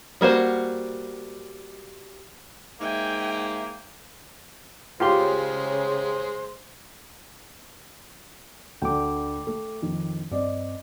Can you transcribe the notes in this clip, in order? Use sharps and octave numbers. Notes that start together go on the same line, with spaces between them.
G3 A#3 F#4 C5
G#2 A#3 E5 G5 G#5
C#3 G#3 F4 G4 C5 C6
D2 D3 G5 D6
A3 A4
F2 D#3
G2 C4 D5 D#5